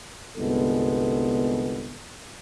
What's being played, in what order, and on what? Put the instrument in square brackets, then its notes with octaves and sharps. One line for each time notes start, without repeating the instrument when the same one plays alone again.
[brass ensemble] G1 C2 G#3 B3 A4